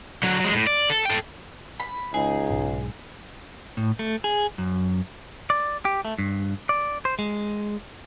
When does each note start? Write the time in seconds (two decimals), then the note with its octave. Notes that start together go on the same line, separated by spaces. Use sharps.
0.23 D3 F#3
0.40 F#3 G#3
0.52 A2
0.67 D5
0.90 A4
1.05 A4 G5
1.80 B5
2.14 C#2 D#4 G#4
2.50 B1 G#2
3.77 A2
3.99 A3
4.24 G#4
4.58 F#2
5.50 D5
5.85 G4
6.05 A3
6.19 G2
6.69 D5
7.05 C5
7.19 G#3